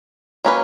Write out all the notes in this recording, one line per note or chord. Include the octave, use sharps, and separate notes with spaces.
F#3 A#3 C#4 G#4 B4